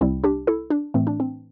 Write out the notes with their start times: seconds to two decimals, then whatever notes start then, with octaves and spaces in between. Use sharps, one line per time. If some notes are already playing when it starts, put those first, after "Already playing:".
0.01 C2 C3 G3 C4 E4
0.24 D4 G4
0.47 E4 A4
0.70 D4
0.94 A2 E3 A3 C4
1.07 D4
1.20 C4